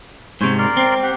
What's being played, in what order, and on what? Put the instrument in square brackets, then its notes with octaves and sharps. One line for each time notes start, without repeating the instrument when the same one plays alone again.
[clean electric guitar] G#2 C3 [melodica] C5 C#5
[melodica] A#4 D5 C6
[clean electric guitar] C4
[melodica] G4 F#5